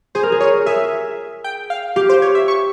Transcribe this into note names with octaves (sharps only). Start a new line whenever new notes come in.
G#4 C5
A#4
G#4
A#4 C#5
G#4 E5
G5
F5
G4 F5
C5
C#5
E5
C#6